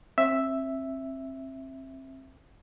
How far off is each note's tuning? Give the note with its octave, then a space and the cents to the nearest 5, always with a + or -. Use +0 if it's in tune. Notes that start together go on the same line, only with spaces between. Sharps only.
C4 +30 E5 +0